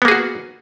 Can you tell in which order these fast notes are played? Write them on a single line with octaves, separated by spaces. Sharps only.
B3 A#3 G#4 F#4